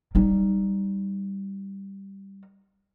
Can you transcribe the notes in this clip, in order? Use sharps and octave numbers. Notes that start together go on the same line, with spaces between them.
G3 D#4